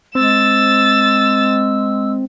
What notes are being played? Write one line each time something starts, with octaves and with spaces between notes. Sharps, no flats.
G#3 C4 E6 A6 E7